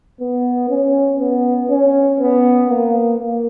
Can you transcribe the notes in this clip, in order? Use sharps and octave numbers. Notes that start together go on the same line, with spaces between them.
B3
C#4
B3
C#4
B3
A#3
A#3